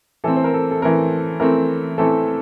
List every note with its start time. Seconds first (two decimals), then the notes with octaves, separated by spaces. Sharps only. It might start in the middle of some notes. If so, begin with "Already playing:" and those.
0.24 E3 A3 C4 A4
0.36 C5
0.44 A#4
0.54 A4
0.71 A4
0.82 E3 A3 C4 A#4
1.40 E3 A3 C4 A#4
1.98 E3 A3 C4 A4